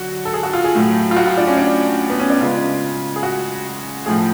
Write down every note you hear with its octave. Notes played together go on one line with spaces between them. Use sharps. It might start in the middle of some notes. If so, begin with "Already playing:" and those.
Already playing: D3 F#3 F#4
A4
G#4
F#4
F4
G#4
A2 F#3 A3
F4
F#4
F4
D4
C#4
D4
B3
C#4
D4
C#3 G#3 F4
G#4
F#4
A2 F3 A3 G#4